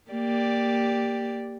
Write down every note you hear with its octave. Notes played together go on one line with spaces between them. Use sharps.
A#3 G4 D5